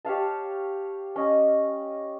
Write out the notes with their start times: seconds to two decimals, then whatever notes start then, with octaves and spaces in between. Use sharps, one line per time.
0.05 G4 C#5 F5 A5
1.16 C#4 D#5